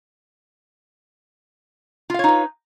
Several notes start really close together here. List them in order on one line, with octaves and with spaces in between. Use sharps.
F4 F5 C#5 D#4 B4